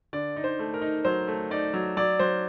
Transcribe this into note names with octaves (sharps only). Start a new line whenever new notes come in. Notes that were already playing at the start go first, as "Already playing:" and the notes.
D3 D5
D#4
C5
A3
A#4
D#4
F#3 C5
A3
D#4 D5
F#3
F#3 D5
F#3 C5